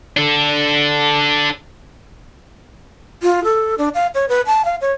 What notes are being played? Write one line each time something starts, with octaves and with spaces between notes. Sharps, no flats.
D4 A4
F4
A4
D4
F5
C#5
B4
A5
F5
C#5